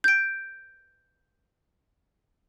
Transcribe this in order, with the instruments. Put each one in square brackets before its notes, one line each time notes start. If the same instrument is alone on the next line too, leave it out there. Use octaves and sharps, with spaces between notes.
[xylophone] G6 D7